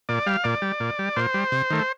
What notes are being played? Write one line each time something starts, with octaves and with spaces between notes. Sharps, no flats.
A#2 D5
G3 F5
A#2 D5
G3
A#2
G3
A#2 C5
G3
C3
D#3 A3